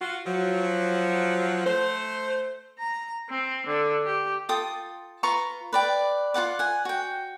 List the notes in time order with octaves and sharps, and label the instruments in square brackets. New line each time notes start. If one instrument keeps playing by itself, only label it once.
[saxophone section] F4 F#4
F3 F#3
A3 A4 C5
[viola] A#5
C4
D3
G4
[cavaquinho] F4 A4 G5 D#6
F4 B4 A#5 C#6
B4 D5 G5
F4 A4 F#5 D6
F#5 G#5
F#4 G5